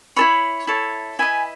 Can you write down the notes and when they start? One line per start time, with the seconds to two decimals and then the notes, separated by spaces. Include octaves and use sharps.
0.16 E4 A4 C#5 B5
0.67 E4 A4 C#5
1.19 E4 B4 D#5 G#5